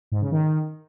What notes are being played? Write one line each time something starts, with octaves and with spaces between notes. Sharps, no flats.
G#2
C#3
D#3